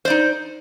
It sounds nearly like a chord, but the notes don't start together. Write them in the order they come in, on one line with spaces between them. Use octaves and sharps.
C5 D5 D#4